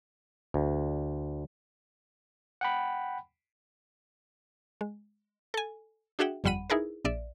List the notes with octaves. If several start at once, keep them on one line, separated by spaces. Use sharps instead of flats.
D2
F#5 G5 B5
G#3
A4 G#5
D4 F#4 G#4 E5 F#5 G5
G1 F2 G3 F#5 B5 D#7
D#4 E4 G#4 A#4 B4
A#1 D5 E5